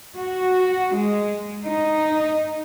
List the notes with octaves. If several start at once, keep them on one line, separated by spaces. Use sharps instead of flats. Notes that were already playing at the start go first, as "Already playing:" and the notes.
F#4
G#3
D#4